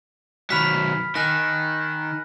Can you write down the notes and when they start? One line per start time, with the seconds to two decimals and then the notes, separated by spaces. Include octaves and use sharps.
0.50 D#3 F#3 B5 F6 B6
1.15 D#3 G#5 F#6 A#6